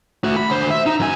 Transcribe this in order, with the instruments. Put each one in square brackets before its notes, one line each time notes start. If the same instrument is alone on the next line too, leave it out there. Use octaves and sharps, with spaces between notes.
[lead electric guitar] A3 F#4
B5
D2 C5
E5
D#4
F#2 G#5